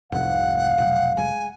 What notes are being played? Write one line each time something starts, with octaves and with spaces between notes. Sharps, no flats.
F1 C2 G#2 F5 F#5
B1
G#3 G#5